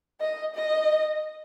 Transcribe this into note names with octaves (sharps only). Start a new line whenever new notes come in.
D#5
D#5